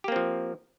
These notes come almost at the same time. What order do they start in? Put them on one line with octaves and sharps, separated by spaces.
G4 A#3 C4 F3